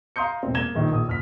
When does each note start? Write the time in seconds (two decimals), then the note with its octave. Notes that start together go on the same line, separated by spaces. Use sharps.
0.16 F5 A#5 C6 D#6 G6 C#7
0.43 E1 C4
0.55 A#3 G#6 E7 G7
0.75 A#1 D#3
0.92 A#1 D#6
1.08 F#1 F6 B6